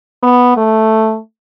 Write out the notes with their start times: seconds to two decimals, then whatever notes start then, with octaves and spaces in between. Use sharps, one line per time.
0.23 B3
0.57 A3